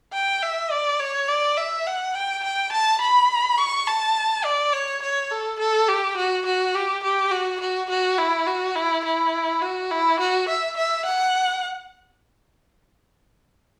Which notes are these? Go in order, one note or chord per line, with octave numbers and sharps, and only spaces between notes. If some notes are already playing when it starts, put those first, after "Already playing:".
G5
E5
D5
C#5
D5
E5
F#5
G5
G5
A5
B5
C#6
A5
D5
C#5
C#5
A4
A4
G4
F#4
F#4
G4
G4
F#4
F#4
F#4
E4
F#4
E4
E4
F#4
E4
F#4
E5
E5
F#5